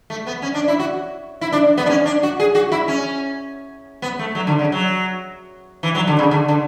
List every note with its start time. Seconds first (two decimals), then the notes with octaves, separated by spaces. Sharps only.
0.10 A3
0.27 B3
0.42 C#4
0.54 D4
0.68 E4
0.79 F#4
1.41 E4
1.52 D4
1.77 B3
1.86 D4
1.90 C#4
2.06 D4
2.23 F#4
2.40 G#4
2.55 F#4
2.72 E4
2.88 C#4
4.02 B3
4.19 A3
4.35 F#3
4.47 D3
4.59 C#3
4.72 F#3
5.83 E3
5.95 F#3
6.07 D3
6.19 C#3
6.31 D3
6.48 D3